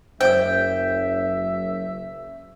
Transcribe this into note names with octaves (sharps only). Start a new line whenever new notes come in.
F#1 F#2 C5 D5 E5 G5 E6